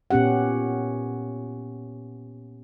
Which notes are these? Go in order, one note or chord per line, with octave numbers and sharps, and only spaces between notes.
A#2 B3 C#4 G4 F#5